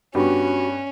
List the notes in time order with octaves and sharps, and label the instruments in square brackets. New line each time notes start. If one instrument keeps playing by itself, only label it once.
[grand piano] G2 B3 G4 [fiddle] C#4 [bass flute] F#4